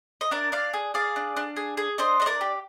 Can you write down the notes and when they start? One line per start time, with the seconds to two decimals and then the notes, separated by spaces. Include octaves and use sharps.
0.21 D#5
0.31 D4 A#4 D5
0.52 D4 D5 F5
0.73 G#4
0.94 G#4 D5 F5
1.16 D4
1.37 D4
1.57 G#4
1.77 G#4
1.98 D4 C5 D#5
2.20 D4 D#5
2.26 A#4 D5
2.41 G4